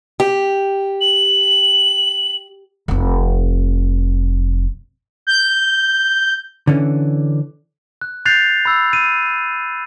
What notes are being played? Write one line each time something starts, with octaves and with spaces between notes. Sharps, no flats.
G4
F#7
F1 C4
G6
D3 E3 C#4
F#6
F#6 G6 A6 C7 F7
B5 E6
D#7